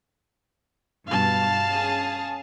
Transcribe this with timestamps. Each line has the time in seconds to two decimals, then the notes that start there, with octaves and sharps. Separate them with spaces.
1.07 G2 B2 F5 A5
1.70 C#4 G#4